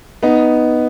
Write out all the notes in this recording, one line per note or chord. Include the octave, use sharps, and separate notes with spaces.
B3 D#4